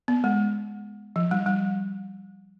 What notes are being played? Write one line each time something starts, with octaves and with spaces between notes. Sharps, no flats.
B3
G#3
F3
G3
G3